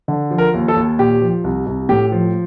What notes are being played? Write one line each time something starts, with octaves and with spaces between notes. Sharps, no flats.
D3
F3
A#4
D#2
A4
D#2
A#2 G4
F3
C2
C2
A2 G4
F3